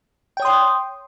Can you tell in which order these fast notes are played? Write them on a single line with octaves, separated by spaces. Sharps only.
G5 C#5 D#6 C6